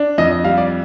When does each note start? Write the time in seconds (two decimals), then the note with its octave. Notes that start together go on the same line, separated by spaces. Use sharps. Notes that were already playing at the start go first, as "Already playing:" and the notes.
Already playing: D4
0.18 F2 D#5
0.32 D#5
0.44 G3 F5
0.58 D5